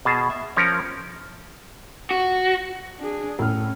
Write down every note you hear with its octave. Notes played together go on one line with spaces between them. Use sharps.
B2 G#4 A5
E5
F3 C#4 A#4 C#5
F#4
D4 G#4
A2 C#4 F6